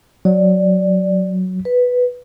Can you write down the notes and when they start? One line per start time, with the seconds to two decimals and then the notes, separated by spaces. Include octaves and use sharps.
0.25 F#3 D5
1.65 B4